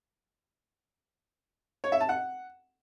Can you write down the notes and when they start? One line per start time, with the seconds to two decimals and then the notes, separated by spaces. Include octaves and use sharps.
1.84 C#5
1.92 E5
2.01 A5
2.09 F#5